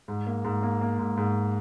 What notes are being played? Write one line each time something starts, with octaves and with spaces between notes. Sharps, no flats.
G#2
A#3
G#2
A#3
A#3
G#2
G#2